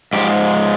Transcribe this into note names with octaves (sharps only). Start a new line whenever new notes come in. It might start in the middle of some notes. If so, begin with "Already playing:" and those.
G#2 F3 G#3 G4